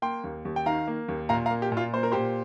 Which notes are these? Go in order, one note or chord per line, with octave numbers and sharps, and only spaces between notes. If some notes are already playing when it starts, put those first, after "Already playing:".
A#3 G5 C6
D#2
D#2
G5
D#3 F5 A#5
A#3
D#2
A#2 F5 A#5
F5 A#5
A#3
G4
A#2
F4
A#3 C5
A#4
A#2 G4 C5